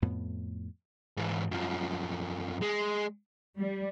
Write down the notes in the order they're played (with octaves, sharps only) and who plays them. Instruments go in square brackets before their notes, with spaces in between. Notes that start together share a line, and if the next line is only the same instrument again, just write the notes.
[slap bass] F2 A2 B3
[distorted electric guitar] G#2 E3
F#2 F3
G#3
[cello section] G3